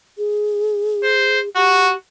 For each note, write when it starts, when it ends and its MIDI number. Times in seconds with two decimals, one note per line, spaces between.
0.18 1.49 68
1.04 1.39 72
1.56 1.93 66
1.56 1.96 67